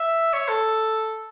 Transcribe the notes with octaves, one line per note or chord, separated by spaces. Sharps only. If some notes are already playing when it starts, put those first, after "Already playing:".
Already playing: E5
C#5
A4